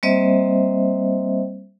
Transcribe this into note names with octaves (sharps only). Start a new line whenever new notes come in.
G3 A#3 C4 C5 D#5 E5